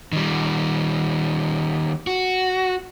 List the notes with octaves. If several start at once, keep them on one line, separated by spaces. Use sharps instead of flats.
D#3 G3
F#4